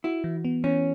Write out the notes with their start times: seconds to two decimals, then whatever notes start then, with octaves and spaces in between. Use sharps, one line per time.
0.04 E4 F#4
0.24 E3
0.44 B3
0.64 E3 C#4